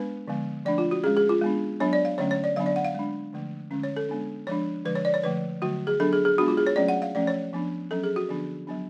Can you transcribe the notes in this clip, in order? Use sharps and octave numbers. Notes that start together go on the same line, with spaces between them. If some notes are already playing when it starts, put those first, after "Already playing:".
Already playing: G#3 B3 D4 B4
D3 F3 G#3 B3
F3 A3 D4 D5
F4
F#4
G#3 C#4 G#4
G#4
F4
G#3 B3 D4
F#3 B3 D4 C#5
D5
F5
D3 F#3 A3 C#4 C#5
C#5
D5
D3 F#3 B3 D4 F5
D5
F#5
F5
G#3 D4
D3 F3 A3
D3 G#3 C#4
C#5
A4
G#3 B3 D4
F3 G#3 D4 C#5
D3 F3 G#3 B4
C#5
D5
C#5
D3 F3 A3 B4
D3 F#3 A3 F#4
G#4
F#3 B3 D4 A4
G#4
G#4
G#3 B3 D4 F#4
F4
G#4
C#5
F#3 A3 C#4 D5
F#5
F5
F3 A3 C#4 D5
C#5
F3 B3 D4
F#3 C#4 A4
G#4
F#4
D3 F3 B3 D4
F#3 B3 D4